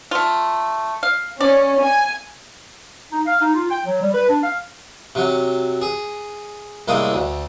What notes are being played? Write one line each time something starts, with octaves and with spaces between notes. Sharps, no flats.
A3 F4
F5
C#4 D5
G#5
D#4
F5
D#4
F4
G5
F#3
G3
B4
D4
F5
C3 F#3
G#4
C2 A2 G#3 A#3 D#6
D2